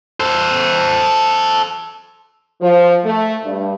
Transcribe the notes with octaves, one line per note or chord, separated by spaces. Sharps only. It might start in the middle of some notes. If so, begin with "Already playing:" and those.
A4 C5
F3
A3
G2